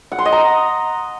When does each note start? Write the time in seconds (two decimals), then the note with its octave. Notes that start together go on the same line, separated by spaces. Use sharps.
0.12 F#5
0.19 C6
0.25 D#5
0.32 A#5